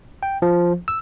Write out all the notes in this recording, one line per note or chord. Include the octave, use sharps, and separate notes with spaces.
G5
F3
E6